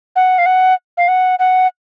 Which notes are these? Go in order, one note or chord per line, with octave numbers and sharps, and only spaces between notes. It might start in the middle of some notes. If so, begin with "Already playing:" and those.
F#5
F5
F#5
F5
F#5
F#5